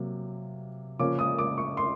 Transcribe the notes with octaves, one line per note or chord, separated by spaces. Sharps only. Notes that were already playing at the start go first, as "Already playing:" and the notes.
Already playing: C3 F#3 A#3
C#3 F3 A#3 C#4 D6
D#6
D6
C#6
C6